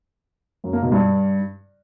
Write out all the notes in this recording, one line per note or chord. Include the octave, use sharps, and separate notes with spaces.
F#2
A#3
B2
G2